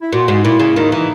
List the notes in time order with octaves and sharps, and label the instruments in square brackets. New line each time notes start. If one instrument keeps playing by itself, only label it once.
[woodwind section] E4
[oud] A#2 [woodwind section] F#4
[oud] G#2
[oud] A#2 [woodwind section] E4
[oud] C#3
[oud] D#2 D#3 [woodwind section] D#4
[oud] E3